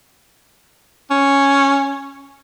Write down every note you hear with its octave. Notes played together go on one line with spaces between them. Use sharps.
C#4